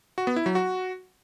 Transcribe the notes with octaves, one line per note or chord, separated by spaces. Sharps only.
F#4
B3
E4
F#3
F#4